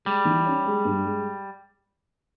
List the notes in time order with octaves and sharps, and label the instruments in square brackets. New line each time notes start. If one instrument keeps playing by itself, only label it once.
[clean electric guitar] G3 [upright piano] G#3
[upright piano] E3
C#4
G#3
G2
G#3